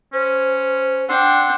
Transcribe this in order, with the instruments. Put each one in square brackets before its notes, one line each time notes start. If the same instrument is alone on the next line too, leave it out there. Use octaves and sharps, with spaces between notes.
[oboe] C#4 [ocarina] C5
[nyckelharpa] D4 G5 [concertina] F#5 C6 E6